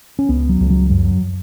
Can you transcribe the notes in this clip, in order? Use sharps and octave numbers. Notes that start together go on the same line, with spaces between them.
C#4
C#2 B3
F#3
C#2
F#3
F#2 F#3
F#3